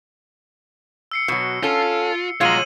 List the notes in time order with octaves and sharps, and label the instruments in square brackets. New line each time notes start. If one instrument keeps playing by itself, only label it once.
[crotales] E6 C7 C#7
[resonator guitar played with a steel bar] B2 F#3
[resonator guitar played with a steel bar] C#4 A4 [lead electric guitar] F4
[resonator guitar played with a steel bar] B2 G#3 F4 [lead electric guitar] C#5 A#5 [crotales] E6 D#7 F#7